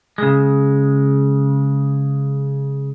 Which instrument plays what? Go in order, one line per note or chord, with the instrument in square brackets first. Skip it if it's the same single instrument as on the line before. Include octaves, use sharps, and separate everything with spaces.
[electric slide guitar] C#3 G#3